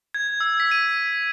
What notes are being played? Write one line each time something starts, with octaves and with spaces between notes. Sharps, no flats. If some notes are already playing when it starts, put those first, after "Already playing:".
G#6
E6
B6
D#7